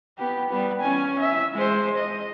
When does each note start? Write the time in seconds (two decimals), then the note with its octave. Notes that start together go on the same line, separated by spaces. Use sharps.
0.18 B3 G4
0.50 G3 B3
0.82 C#4 G#5
1.20 E5
1.54 G#3 C5
1.97 D#5